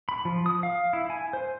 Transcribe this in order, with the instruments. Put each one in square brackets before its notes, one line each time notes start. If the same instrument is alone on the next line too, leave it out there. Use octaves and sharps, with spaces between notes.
[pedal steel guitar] B5
F3
D#6
F5
E4
G#5
C5